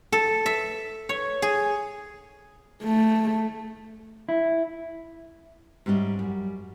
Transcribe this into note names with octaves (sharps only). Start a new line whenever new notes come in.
A4
E5
C#5
G#4
A3
E4
G#2 G3 C#4 C5 D#5 E5
F#2 G3